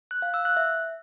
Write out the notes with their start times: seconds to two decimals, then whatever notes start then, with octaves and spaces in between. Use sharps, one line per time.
0.11 F#6
0.22 F5
0.34 E6
0.45 F#6
0.57 E5